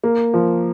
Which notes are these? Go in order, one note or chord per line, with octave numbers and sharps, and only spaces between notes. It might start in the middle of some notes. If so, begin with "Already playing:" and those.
A#3
F3